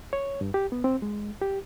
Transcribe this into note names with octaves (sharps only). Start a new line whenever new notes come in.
C#5
G2
G4
B3
C4
G#3
G4